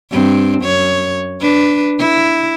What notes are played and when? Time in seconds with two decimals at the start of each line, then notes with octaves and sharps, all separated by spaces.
0.12 G2 C4
0.62 F#2 C#5
1.41 D4 B4
1.99 E4